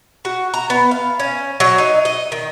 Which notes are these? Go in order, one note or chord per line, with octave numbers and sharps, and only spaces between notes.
F#4
A#5
B3
F5
C#4
F#3
D#4
D#5
D#3